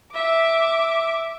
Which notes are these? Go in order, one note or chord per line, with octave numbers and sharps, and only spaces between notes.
E5 D6